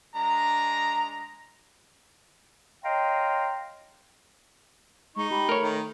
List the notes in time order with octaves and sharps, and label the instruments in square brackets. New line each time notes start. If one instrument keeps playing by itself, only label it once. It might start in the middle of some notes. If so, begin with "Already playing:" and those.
[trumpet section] G#3 D4 A#5
[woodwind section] C#5 D#5 F5 G5 A#5 C6
[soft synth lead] G#3 [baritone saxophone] D#4 [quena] C#6
[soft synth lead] G4 [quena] B5
[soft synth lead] A3 [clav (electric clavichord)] A#4 C#5
[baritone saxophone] D#3